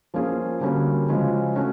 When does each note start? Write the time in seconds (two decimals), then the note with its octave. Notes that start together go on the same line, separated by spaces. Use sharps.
0.14 F3 A#3 C#4 F4 G#4
0.61 D3 G3 A#3 C#4 F#4
1.08 C#3 F3 G#3 C#4 F#4
1.55 A3 C#4 F#4